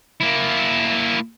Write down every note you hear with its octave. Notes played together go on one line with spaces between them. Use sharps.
A#3 E4